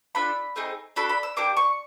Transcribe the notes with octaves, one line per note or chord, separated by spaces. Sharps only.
D4 F4 A4 B5
A3 C4 D#4 G#4
D4 F#4 A4 B5
B5
E6
A#3 D4 G4 D6
C#6